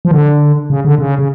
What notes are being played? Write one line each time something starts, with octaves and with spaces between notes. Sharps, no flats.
F3
D3
C#3
D3
C#3
C#3